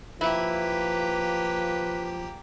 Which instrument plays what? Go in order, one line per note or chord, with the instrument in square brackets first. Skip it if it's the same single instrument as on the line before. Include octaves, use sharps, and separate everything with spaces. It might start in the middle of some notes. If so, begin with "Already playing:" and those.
[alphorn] F3 [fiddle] A#3 G4 [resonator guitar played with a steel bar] E4 [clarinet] B4